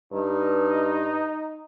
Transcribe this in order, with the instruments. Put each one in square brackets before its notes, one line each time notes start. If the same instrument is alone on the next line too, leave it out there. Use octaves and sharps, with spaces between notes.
[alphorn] G2 [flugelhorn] D#4